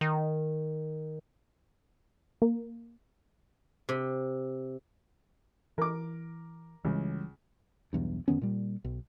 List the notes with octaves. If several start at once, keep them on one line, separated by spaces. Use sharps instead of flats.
D#3
A#3
C3
E3 A#4 D6
C#2 E3 G3
B1 E2 G2
F#2 D#3 B3 C#4
A#2 G3
B1